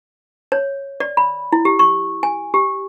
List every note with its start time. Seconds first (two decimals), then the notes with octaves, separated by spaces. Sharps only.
0.52 C#5
1.00 D5
1.17 B5
1.52 E4
1.65 G4
1.79 C#6
2.23 G#5
2.54 G4